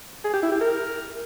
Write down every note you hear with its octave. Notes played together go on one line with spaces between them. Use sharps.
G#4
G4
E4
G4
A#4